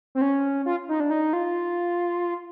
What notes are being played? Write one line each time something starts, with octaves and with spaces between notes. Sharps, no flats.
C4
C#4
F4
D#4
D4
D#4
F4